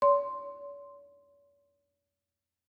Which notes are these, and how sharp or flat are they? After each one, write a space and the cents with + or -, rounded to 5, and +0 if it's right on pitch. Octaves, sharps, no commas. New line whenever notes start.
C#5 +45 C6 +0